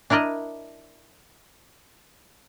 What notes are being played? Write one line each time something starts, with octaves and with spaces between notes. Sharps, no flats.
D4 E4 A#4 D5 D#5